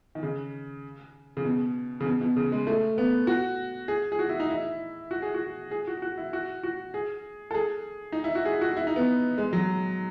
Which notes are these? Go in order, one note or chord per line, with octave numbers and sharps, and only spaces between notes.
D#3
C#3
C#3
B2
C#3
B2
B2
C#3
G#3
A3
B3
F#4
G#4
G#4
F#4
E4
D#4
E4
F#4
G#4
F#4
G#4
F#4
F#4
E4
F#4
F#4
G#4
A4
G#4
D#4
E4
F#4
G#4
F#4
E4
D#4
B3
G#3
F#3